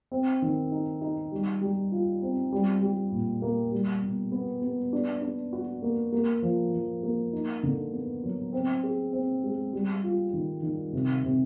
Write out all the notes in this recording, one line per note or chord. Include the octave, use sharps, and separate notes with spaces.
C4
D#3
D#4
D#4
G3
G3
F4
C4
G3
G3
A#2
A#3
G3
B2
B3
B3
D4
D4
F#4
A#3
A#3
F3
F3
A#3
D#4
D3
B3
F#3
C4
G#4
C4
G#3
G3
F4
D#3
D#3
C3
C3